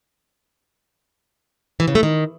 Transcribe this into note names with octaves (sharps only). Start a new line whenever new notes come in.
E3
C#3
A3
D#3